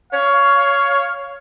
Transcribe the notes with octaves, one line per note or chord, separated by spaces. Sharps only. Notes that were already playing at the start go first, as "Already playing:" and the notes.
C#5 F5